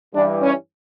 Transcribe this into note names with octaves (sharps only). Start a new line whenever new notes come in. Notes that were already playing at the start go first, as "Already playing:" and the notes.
G2 E3 G3 D4
C#4